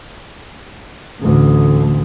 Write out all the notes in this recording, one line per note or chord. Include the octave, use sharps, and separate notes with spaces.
A1 D2